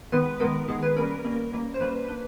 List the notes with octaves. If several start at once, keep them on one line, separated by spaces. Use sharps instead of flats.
D#3 G#3 B3 B4
D#3 G#3 B3 A#4
D#3 G#3 B3 G#4
B4
G3 A#3 C#4 A#4
G3 A#3 C#4
G3 A#3 C#4
C5
G3 A#3 C#4 B4
A#3 D4